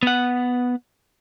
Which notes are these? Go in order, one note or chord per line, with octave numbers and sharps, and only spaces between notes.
B3 F#5